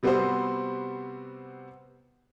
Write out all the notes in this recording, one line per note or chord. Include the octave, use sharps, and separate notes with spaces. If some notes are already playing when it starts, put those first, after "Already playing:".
C3 G3 B3 C4 F#4 C5